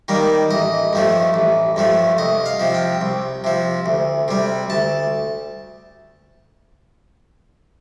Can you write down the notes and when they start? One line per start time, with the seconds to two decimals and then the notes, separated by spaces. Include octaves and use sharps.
0.08 D#3 G3 A#3
0.51 A1 D#5
0.93 G2 F3 A3
1.34 A1
1.76 G2 F3 A3
2.18 C2 D#5
2.46 F5
2.59 C3 F3
2.74 G5
3.01 C2
3.44 C3 F3
3.86 D2
4.28 C3 G3
4.70 D2 A5